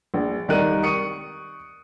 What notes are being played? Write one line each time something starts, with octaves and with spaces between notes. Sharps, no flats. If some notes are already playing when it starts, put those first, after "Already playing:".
A#1
C2 D#3 A#4 D5 F#6 D#7
C#6 D#6 C#7 D#7